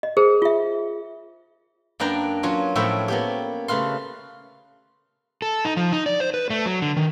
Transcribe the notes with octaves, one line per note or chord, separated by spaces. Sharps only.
D#5
G#4 A#4 C5
F4 E5
F#2 A#3 D4 B4 G5 A#5
F#3 C#4 F4
A2 F3 F#3 E5 G5 B5
A#3 B3 G4
C#3 A3 B4 F5 C6
A4
D#4
F3
D#4
D5
C5
B4
A3
F#3
D3
D#3